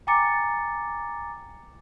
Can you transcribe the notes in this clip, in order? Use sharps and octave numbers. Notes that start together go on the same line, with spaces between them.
G5 G#5 A#5 D6 A6 C#7